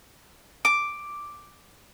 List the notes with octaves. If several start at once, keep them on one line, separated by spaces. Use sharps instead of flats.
D6